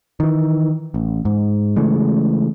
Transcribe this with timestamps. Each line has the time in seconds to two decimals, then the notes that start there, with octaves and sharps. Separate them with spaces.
0.20 D#3 E3
0.94 A1
1.25 G#2
1.76 C#3 E3 G#3 A3